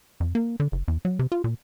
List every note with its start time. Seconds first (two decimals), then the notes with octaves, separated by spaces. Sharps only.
0.20 F2
0.35 A#3
0.60 D3
0.72 F#1
0.88 E2
1.05 F#3
1.19 C3
1.32 F4
1.44 A#2